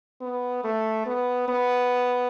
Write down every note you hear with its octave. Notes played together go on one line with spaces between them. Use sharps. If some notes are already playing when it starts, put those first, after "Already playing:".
B3
A3
B3
B3